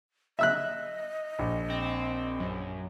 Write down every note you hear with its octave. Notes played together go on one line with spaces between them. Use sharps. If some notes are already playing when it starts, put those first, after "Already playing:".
D#5 E5 E6 F#6
A#1
C4
F#2